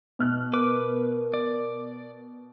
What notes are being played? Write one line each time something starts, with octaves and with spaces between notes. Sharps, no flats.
B2 F6 F#6
A#4 B4 D6
D5